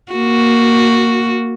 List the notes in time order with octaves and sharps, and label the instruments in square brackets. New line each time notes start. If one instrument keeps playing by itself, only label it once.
[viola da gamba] A#3 F#4